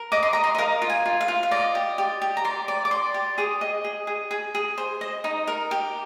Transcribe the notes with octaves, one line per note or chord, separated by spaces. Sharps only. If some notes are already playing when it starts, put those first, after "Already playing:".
Already playing: A#4
D#5 D6
C6
D#5 A#5
C6
D#5
A#4 F5
F4
G#5
F4
F5
F4
F5
D5 D#5
G4
G4
G4
A#5
D5 C6
D5
D6
D5 C6
G4
G#4 D#6
D#5
G#4
G#4
G#4
G#4
C5
D#5
D#4
A#4
G4